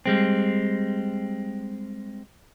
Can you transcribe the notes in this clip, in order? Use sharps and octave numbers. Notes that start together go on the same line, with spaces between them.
G3 G#3 C4